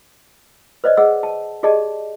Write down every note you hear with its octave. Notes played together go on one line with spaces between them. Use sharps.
B4 C5 D5 D#5
G#4 D#5 F#5 E6
A5
G4 G#4 D5 D#5 A5